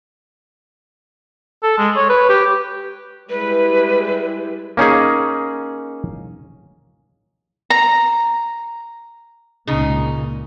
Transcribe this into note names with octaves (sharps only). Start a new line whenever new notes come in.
A4
G#3
C#5
B4
G4
G3 G#3 E4 B4
A#3 C#4 D#4 G#4
A#5
C#2 A#2 C#3 D#4